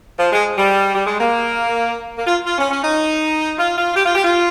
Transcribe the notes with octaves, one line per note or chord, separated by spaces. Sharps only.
F3
G#3
G3
G3
G#3
A#3
A#3
F4
F4
C#4
C#4
D#4
F4
F4
G4
F4
G4
F4